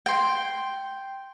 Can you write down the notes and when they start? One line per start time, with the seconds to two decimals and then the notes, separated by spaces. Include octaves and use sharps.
0.06 G5 C6